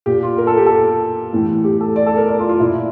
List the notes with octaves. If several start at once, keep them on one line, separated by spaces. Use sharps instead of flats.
A#2 G4
F4
A#4
A4
G4
A4
A2 E3
G4
A4
D5
A4
A#4
D5
F4
F4
A#2 E4